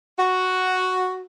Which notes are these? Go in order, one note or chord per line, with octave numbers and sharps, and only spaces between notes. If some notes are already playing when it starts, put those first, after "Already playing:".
F#4